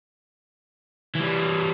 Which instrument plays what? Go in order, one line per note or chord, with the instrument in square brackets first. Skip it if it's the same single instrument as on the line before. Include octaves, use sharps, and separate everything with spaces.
[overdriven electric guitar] E3 G3